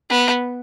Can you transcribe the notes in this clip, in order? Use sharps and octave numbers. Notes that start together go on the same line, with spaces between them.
B3